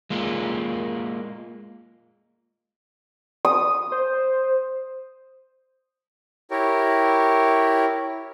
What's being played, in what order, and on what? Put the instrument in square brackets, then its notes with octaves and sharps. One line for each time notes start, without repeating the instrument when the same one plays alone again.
[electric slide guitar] G#3 A#3 F4
[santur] D#6
[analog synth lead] C5
[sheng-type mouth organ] E4 G4 A#4 C#5